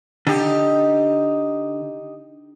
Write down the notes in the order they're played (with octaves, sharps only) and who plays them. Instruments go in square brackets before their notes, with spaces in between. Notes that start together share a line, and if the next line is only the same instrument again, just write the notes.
[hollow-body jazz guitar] D3 [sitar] D#4 G4